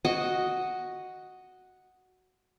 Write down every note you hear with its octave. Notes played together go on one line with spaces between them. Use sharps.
F#4 D#5